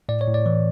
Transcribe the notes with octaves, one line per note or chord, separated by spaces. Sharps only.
A2 D5
C#5
A2
D5
E3